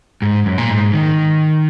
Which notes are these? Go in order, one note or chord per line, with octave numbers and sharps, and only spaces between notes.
G#2
F#2
A#2
G#2
D#3